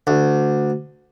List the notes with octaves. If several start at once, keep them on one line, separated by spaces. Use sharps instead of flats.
D2